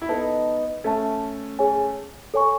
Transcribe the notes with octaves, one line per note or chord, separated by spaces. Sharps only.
E4
B3 D#4 A4 D#5 A5
A3 C#4 A4 E5 A5
G#4 C#5 G#5
A4 C#5 G#5 C#6